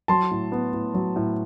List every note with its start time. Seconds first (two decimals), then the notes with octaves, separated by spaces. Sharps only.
0.08 F#3 A5 C6
0.31 A2
0.52 B3
0.73 A2
0.94 F#3
1.16 A2